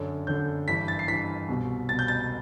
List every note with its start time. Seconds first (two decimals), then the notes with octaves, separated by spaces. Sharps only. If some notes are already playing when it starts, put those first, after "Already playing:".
Already playing: F#2 D3
0.27 F#2 D3 G6
0.68 G2 E3 B6
0.88 A6
0.99 C7
1.08 G2 E3 B6
1.48 C2 B2
1.89 C2 B2 A6
1.99 G6
2.08 A6